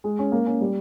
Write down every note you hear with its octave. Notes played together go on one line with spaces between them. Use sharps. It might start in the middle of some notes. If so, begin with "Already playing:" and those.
G#3
C#4
A#3
C#4
G3